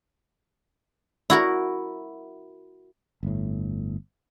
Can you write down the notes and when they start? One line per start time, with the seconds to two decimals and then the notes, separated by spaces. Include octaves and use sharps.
1.30 E4 F#4 A#4
3.23 G1 A2